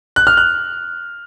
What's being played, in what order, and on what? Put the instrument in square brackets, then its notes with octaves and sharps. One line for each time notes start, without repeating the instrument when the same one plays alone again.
[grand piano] F#6
F6
F#6